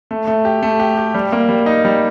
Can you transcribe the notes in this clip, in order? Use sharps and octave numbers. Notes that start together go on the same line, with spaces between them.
A3
A3
G4
A3
G4
G4
G3
A#3
G3
D#4
G3